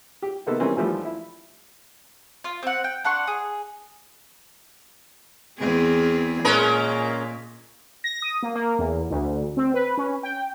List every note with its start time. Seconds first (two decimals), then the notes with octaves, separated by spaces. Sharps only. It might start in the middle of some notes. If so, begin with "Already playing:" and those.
0.22 G4
0.47 C3 D#3 A#3 B3 D#4 A4
0.60 D#3 E3 G3 A#3 C4 C#4
0.76 D#2 E3 F3 G3 A3
1.05 E4
2.44 F4
2.63 C4 F#5
2.84 G5
3.04 D4 F#5 C6 C#6
3.27 G#4
5.58 E2 C4 G#4
6.45 A#2 G#3 C#4 A#4
8.04 A#6
8.22 D#6
8.43 A#3
8.56 A#3
8.79 E2
9.10 D2
9.57 C4
9.74 B4
9.97 C#4
10.23 G5